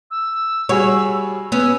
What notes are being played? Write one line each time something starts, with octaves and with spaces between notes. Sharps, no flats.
E6
G3 F#4 G#4 C#5
B3 C#4 E6